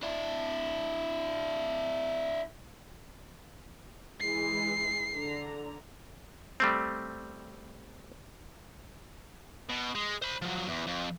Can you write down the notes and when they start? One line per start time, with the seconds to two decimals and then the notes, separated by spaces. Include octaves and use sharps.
0.03 D4 E4
4.20 E3 G#3 C7
5.13 D3 A#5
6.60 G3 A3 C4
9.69 B2
9.95 G#3
10.22 C5 B5
10.42 F3 F#3
10.68 E2
10.87 F2